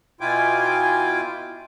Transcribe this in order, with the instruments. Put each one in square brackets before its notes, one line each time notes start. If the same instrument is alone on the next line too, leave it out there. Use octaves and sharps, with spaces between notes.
[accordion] B2 E4 F4 G5 G#5 D6